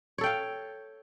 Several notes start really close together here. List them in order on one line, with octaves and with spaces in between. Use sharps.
C#5 A4 G5 F5